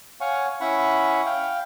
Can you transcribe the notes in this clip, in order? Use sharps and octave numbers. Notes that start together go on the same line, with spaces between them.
C#5 F5 F#5 G#5 C#6
C#4 E4 F#5 B5 C#6
F5 G5